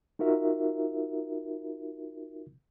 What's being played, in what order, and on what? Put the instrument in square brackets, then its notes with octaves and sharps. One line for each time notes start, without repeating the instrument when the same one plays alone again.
[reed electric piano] D#4 F4 F#4 A#4 E5